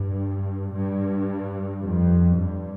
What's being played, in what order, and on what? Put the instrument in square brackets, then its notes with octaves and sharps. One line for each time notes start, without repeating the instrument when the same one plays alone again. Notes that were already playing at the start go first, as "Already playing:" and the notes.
Already playing: [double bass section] G2
G2
F2
G2